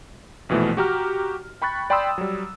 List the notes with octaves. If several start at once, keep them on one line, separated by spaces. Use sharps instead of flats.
A#1 B2 E3 F3 A3
F#4 G4 A#5 F6
G5 B5 C#6 F#6 A6
D5 G5 B5 C6 D#6 E6
F#3 G3